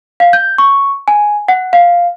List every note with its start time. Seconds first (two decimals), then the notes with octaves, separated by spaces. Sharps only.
0.20 F5
0.33 G6
0.58 C#6
1.08 G#5
1.48 F#5
1.73 F5